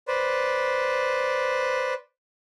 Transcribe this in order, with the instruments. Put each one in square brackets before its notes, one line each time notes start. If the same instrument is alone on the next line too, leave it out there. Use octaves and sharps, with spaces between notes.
[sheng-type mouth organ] B4 C5 D5